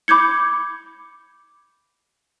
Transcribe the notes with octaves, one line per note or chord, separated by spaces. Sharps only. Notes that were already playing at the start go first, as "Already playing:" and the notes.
B5 D6 G6 G#6 C#7